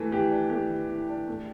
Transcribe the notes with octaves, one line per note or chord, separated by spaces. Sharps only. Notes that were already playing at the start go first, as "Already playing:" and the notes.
Already playing: E3 A3
E3 G4
D4
A3 G4
E3
E3
D4
A3